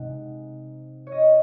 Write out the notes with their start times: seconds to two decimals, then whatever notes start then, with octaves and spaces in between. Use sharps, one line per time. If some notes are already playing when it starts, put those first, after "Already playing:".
Already playing: C3 G#3 D#4 F#5 G#5
1.07 C#5
1.12 D#5